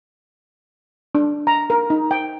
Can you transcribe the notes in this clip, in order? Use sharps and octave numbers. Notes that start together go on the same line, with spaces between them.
D4
A#5
A#4
D#4
G5